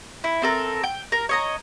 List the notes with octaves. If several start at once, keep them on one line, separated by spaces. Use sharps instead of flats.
E4
C4 A4 A#4
G5
A#4
C#5 D#5 A#5